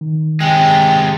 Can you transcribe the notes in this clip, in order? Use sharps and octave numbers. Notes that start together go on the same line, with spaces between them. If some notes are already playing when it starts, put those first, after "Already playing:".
D#3
C3 G#3 G5